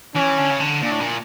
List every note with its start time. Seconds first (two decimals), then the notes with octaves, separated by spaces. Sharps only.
0.15 E3 C#4
0.38 D3
0.51 C#3
0.60 D3
0.82 A#2 D4
0.92 A2
1.00 A#2